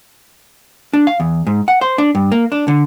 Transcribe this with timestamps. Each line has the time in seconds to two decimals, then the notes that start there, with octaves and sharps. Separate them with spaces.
0.93 D4
1.07 F5
1.20 E2
1.47 G#2
1.68 F#5
1.81 C5
1.98 D4
2.15 G2
2.32 A#3
2.52 D4
2.68 D3